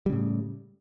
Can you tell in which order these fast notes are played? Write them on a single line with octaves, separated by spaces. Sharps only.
G3 C#3 A2